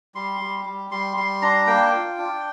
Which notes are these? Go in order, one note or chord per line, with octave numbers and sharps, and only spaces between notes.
G3 C6
G3
G3
G3 C6
G3 C6
D4 A#5
A#3 G5
F4
D4